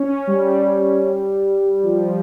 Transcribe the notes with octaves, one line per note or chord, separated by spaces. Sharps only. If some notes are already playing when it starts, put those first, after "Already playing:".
Already playing: C#4
G3
F3